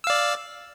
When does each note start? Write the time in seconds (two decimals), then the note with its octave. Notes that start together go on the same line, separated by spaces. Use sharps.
0.04 E6
0.07 F5
0.10 D5